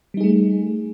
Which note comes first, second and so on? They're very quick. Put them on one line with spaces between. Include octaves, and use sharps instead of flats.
G3 D#4 G#4 A3